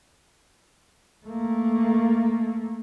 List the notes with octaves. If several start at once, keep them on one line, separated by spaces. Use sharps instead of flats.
A3 A#3